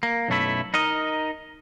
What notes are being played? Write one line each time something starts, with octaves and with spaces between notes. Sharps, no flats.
A#3
B1 F#2 A3 E4
D#4 A#4 D#5